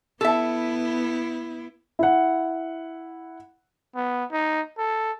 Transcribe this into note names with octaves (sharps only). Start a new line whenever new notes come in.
B3 E4 A4 E5
E4 F#5
B3
D#4
A4